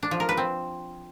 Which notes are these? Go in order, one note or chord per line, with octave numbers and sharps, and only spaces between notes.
D4
F3
A#4
B4
C4